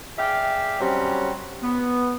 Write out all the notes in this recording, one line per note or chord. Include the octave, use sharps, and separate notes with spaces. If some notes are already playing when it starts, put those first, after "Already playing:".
G#4 D5 E5 F5 G5
F#3 G3 C4 C#4
B3